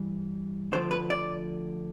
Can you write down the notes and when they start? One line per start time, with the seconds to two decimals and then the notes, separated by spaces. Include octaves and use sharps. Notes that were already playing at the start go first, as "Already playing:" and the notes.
Already playing: G2 E3 G3
0.72 D2 D3 F3 C5
0.91 B4
1.10 D5